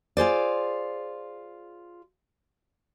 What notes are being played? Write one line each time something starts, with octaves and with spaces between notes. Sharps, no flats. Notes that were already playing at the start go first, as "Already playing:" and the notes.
F4 G#4 C5 D5